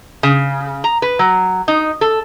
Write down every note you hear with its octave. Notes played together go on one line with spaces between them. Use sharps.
C#3
A#5
B4
F#3
D#4
A4